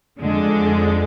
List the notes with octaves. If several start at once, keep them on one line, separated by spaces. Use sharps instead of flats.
F2 D3 G#3